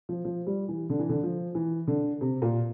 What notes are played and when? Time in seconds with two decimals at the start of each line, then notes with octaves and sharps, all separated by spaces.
0.09 F3
0.25 F3
0.47 G3
0.69 E3
0.90 D3
0.99 E3
1.09 D3
1.23 F3
1.55 E3
1.87 D3
2.21 C3
2.42 A#2